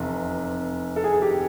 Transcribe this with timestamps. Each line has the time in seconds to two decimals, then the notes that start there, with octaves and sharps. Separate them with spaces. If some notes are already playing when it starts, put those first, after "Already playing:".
Already playing: F1 E2 C3
0.96 A4
1.04 G#4
1.22 G4